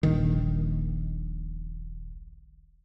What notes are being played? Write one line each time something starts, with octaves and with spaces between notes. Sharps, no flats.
D#1 A#1 D#3